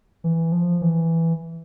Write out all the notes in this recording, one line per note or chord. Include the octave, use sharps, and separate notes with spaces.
E3
F3
E3